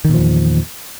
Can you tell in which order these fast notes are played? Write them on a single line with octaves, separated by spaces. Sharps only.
D#3 A#2 F3 E2